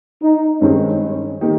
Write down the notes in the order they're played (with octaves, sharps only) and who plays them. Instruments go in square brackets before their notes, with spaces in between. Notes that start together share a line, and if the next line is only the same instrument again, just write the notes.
[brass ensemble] D#4
[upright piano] G2 D#3 G#3 C4 D#4 [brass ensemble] C#4
[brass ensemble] C#4
[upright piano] D#3 A#3 D#4 G4